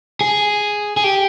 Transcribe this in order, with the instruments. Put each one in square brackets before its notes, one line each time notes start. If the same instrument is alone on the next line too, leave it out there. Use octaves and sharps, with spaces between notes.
[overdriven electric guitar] G#4
G#4
G4